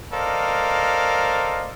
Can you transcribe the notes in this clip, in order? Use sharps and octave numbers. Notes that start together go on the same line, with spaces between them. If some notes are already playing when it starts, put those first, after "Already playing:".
A4 A#4 C5 D5 D#5 F5